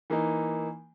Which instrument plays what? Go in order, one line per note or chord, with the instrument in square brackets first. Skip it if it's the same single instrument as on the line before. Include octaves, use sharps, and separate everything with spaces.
[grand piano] E3 A#3 D#4